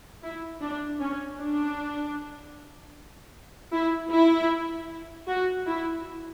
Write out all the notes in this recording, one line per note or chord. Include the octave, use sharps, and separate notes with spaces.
E4
D4
C#4
D4
E4
E4
F#4
E4